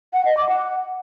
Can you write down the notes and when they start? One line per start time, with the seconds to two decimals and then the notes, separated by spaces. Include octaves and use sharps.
0.13 F#5
0.25 D#5
0.37 D6
0.49 F#5